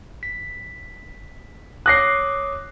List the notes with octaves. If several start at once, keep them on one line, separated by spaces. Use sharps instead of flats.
B6
C#5 D6 D#6 F#6 A#6 C7